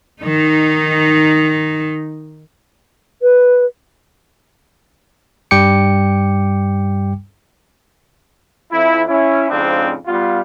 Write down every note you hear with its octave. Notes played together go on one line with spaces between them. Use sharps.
D#3 D#4
B4
G2 G3 G5 D6 C#7
F2 E4
C#4 E4
F2 G#2 C#3 C4 D4
G3 B3 F4